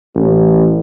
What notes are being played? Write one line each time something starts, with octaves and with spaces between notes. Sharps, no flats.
A1